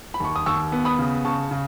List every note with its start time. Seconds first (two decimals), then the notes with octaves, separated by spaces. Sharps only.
0.14 B5
0.20 D#2 C#6
0.36 D#6
0.46 D#2 C#6 E6
0.72 B3
0.85 B5 D#6
0.99 C#3
1.25 C#3 A5 C#6
1.51 C#3